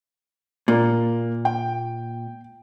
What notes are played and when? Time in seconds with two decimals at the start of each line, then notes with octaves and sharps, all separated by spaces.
0.68 A#2 A#3
1.45 G5